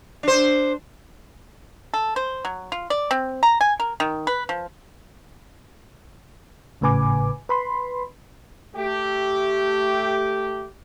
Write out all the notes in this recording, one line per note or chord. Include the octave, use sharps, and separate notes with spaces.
D4 C5
A4
C5
F#3
F4
D5
C4
A#5
G#5
A#4
D#3
B4
F3
G#1 A2 C#3 B4 G#5 D6
B4 B5 C6
A3 G4